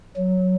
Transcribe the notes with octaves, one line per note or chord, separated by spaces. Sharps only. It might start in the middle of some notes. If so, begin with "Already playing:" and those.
F#3